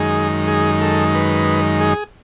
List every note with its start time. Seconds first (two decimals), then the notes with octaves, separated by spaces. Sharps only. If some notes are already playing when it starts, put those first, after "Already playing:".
Already playing: F#2 D#3 G#3 D#4 G#4
0.48 G#4
0.81 A4
1.15 B4
1.80 G#4